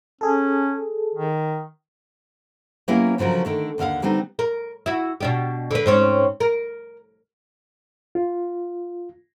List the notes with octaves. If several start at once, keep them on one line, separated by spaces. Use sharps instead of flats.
C#4 G#4 A4
D#3
F#3 A#3 B3 C#4 E4 G4
D2 C#3 F3 F#3 A#4
D3 D#3 A3
D#2 D3 D#4 F5 F#5
D3 G3 B3 C4 D#4
A#4
E4 F#4
B2 D4 G4
D3 B4
G#2 C4 C#4
A#4
F4